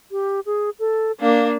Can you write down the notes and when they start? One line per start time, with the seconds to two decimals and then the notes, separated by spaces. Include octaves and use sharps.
0.12 G4
0.46 G#4
0.79 A4
1.21 A#3 D4 F5